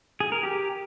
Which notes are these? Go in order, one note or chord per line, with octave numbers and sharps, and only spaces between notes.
G#4
A#4
G4